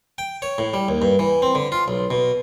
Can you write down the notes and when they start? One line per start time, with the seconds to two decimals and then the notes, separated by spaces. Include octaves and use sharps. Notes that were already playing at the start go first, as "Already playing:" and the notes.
0.18 G5
0.42 C#5
0.58 A2
0.74 G3
0.89 D#2
1.02 G2
1.19 E3
1.42 C4
1.55 D3
1.72 F4
1.88 B1
2.11 B2